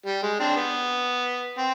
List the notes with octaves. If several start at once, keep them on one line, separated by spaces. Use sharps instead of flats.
G3
G#3
C4 D4
B3
C4